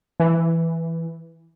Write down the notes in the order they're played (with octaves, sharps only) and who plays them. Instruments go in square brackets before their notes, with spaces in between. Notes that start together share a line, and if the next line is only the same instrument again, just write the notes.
[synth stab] E3